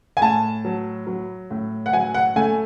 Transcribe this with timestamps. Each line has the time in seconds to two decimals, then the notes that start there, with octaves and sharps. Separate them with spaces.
0.17 G#5
0.21 A2 A5
0.65 F#3
1.07 F#3
1.51 A2
1.86 F#5
1.93 F#3 G#5
2.14 F#5
2.36 A3 G#5